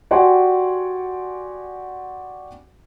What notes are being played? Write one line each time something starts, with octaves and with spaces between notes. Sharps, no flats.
F#4 G4 D5 F#5 G#5 C6